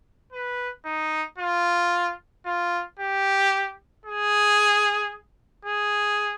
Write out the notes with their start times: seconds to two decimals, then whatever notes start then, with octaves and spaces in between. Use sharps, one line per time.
0.32 B4
0.86 D#4
1.38 F4
2.46 F4
2.99 G4
4.06 G#4
5.65 G#4